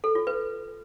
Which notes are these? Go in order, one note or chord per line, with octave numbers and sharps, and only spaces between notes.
A4
F4
B4